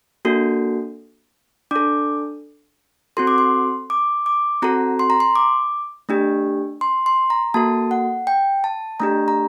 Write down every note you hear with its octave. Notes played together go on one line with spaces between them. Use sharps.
A#3 D4 F#4 A4
D4 A4 D6
C4 F#4 A4 C6
D6
C6
D6
D6
C4 F#4 A4 A#5
C6
A#5
C6
D6
A3 D4 G4
C6
C6
A#5
A#3 F#4 A4 A5
F#5
G5
A5
A3 D4 G4 A#5
A#5